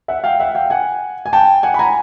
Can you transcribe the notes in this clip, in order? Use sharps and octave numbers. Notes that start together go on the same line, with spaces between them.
E5 F#5
F5 G5
E5 F#5
F5 G5
F#5 G#5
G#5
G5 A5
F#5 G#5
B5
G#5 A#5